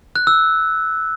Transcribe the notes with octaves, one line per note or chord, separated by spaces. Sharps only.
F#6
E6